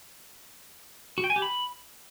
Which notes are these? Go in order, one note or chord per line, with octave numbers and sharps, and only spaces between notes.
F#4
G5
G#5
G4
B5